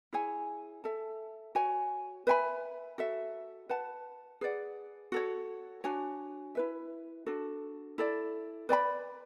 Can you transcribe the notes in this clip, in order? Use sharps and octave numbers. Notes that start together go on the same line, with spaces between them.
E4 G#4 C#5 G#5
A4 E5 A5
F#4 C#5 G#5
B4 E5 G#5 B5
F#4 A4 E5
B4 F#5 A5
G#4 B4 D5 F#5
F#4 A4 C#5
D4 F#4 C#5 G#5
E4 B4 E5
D4 F#4 A4
E4 A4 D5
B4 D5 G#5 B5